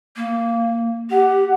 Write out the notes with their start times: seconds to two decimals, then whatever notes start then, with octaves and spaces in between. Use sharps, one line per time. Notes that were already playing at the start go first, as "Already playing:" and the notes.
0.16 A#3
1.10 G4 F#5